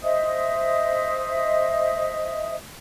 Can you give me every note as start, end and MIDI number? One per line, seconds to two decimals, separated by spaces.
0.02 2.55 72
0.02 2.55 75
0.02 2.55 76
0.02 2.55 87